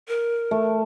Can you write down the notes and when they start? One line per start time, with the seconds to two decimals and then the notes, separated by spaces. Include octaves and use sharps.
0.08 A#4
0.51 A3